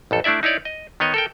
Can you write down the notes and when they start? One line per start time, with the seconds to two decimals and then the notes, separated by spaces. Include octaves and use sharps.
0.11 A1 F2 A4
0.24 A3 D4 E4 D5 E5
0.43 D#4 E4 C#5 D5
0.65 D#5
1.00 D#3 B3 C#5 D#5
1.14 A4 A#4 G5